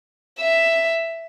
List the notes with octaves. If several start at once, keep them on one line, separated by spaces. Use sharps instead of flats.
E5